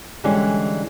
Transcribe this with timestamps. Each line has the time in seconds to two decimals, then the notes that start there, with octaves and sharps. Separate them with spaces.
0.24 D3 E3 G3 G#3 C#4